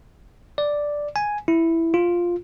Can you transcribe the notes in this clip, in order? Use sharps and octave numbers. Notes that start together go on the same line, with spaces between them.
D5
G#5
E4
F4